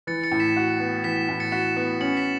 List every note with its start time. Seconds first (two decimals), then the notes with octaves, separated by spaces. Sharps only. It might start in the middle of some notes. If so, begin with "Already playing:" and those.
0.07 E3 A6 C#7
0.24 A6 C#7
0.32 A2
0.40 B6 E7
0.57 F#4
0.80 B3
1.04 E3 B6 E7
1.16 B6
1.28 A2 B6
1.40 A6 C#7
1.52 F#4 B6 E7
1.77 B3
2.01 C#4 C#7 F#7
2.17 B6 E7